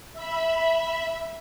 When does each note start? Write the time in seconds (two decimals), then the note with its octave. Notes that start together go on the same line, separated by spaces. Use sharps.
0.13 E5 B5